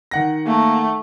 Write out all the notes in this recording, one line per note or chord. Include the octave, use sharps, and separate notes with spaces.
D#3 F#5 A#6
A3 A#3